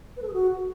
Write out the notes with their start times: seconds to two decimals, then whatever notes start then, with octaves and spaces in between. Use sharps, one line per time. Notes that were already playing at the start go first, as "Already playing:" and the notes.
0.17 B4
0.22 A4
0.28 G#4
0.33 F#4